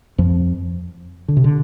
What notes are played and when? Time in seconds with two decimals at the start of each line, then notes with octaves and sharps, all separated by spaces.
0.18 F2 F3
1.28 D3
1.37 C3
1.44 D3